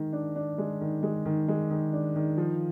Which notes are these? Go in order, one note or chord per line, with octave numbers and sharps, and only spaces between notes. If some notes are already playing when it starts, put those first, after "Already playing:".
Already playing: D#3 G#3
D4
D4
G#3
D#3
G#3
D#3
G#3
D#3
D4
D#3
F3